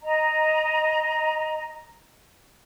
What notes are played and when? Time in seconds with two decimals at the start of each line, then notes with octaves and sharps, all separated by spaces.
0.02 D#5 A#5